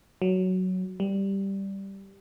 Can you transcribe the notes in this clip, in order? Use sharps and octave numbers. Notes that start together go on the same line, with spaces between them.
F#3
G3